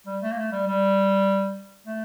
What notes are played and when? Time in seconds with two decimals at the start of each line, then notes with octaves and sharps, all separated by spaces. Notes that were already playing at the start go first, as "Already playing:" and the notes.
0.06 G3
0.22 A3
0.32 A#3
0.37 A3
0.52 G3
0.67 G3
1.86 A3